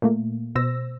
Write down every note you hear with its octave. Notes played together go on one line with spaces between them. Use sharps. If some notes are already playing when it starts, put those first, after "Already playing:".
A#2 A3 A#3
B2 C5 E6 A#6